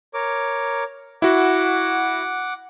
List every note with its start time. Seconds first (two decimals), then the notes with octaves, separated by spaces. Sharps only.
0.14 A#4 C#5 D6
1.22 E4 F#4 F#5 D6